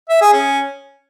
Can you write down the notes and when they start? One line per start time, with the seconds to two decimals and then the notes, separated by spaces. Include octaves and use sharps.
0.09 E5
0.21 G#4
0.33 C#4